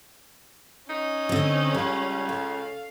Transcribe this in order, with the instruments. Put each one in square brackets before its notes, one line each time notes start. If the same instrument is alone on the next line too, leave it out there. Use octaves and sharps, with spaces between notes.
[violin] C#4 [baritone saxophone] D#4
[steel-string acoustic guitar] D3 C4 [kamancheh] C#5 D#5
[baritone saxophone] C#2 [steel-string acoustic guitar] G3 [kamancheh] F5
[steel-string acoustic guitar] A4 [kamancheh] F5